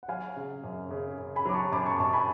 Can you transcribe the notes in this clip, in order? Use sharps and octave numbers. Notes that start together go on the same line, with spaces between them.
F#5
F#3 F5 G#5
C#3
F#2
C#3
C#3
G#5 B5
F#3 D6
A5 C#6
F#2 B5 D6
A5 C#6
F#2 A5 C#6
G#5 B5